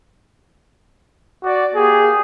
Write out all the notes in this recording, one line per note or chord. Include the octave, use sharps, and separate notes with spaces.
F#4 D5
A#3 G4 G#4